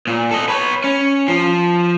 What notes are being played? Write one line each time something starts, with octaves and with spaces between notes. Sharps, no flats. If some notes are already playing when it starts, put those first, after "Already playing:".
A#2
A4 D#5
B4 C#5
C#4
F3